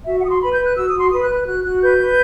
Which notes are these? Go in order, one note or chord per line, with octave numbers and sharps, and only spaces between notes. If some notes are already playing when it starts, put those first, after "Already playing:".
F#4 E5
F#5
F#4 D#6
C6
B4 B5
G6
B4
F#6
F#4 E6
D#6
F#4
C6
B4 D#6
F#6
B4
F#6
F#4 F#6
F#4 F#6
B4 G6
B4